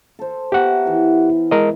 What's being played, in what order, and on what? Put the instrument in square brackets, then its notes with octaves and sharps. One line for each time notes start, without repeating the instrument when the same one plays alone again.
[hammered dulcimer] A4 C5
[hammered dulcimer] B3 A#4 E5 [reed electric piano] G4 F#5
[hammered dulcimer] E3 E4
[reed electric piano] G#3 A#4 D#5